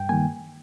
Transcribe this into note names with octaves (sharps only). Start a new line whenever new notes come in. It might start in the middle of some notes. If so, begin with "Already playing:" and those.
Already playing: G2 G5
D#3 G3 A#3 G#5